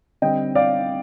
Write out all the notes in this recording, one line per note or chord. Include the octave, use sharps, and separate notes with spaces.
D3 G3 C4 D#5 G5
D5 F5